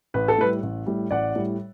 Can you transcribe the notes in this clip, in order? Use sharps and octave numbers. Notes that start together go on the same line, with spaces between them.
A1 B4
A4
A2 G3 B4
A1
A2 G3
A1 D5 F#5
A2 G3